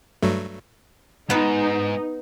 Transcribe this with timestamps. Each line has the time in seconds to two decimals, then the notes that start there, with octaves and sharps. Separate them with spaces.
0.22 G2 F#3 A3
1.30 G#2 B3 D#4 B4